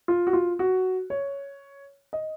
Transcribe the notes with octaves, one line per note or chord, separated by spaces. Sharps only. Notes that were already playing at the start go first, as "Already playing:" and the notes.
F4
F#4
F4
F#4
C#5
D#5